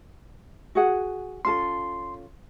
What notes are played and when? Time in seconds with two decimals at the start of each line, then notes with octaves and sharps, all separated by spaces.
0.75 F#4 G#4 F#5
1.45 C#4 F4 A4 C6